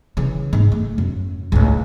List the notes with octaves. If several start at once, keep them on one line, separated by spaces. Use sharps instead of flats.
C#3 E3
G#2
A3
F#2
C#2 A2